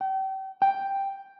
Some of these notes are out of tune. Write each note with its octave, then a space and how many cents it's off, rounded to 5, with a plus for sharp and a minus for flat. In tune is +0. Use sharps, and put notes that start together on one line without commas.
G5 -35
G5 +5